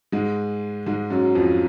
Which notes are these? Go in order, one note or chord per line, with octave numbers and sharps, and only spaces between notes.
G#2 G#3
G#2 G#3
F#2 F#3
F2 F3